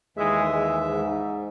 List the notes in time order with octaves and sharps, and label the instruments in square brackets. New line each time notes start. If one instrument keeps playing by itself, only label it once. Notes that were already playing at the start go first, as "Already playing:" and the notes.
[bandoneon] D#2 E3 E5 [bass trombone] G#3
[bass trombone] G#3
G#2